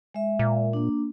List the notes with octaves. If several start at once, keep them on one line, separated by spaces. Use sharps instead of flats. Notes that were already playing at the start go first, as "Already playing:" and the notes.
G#3 E5
A#2
A#3 D4